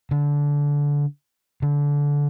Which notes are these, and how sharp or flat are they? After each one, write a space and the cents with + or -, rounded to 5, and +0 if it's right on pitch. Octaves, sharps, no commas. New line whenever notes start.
D3 -20
D3 -25